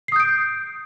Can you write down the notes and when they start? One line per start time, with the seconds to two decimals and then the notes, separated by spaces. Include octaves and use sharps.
0.08 C7
0.12 D#6
0.16 G6
0.20 D7